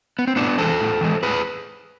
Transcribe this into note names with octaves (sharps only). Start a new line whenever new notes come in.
B3
C4
A2 B3 D4
E3 G#3 A4 C5
A2
E3 G#3
A2 G#4 B4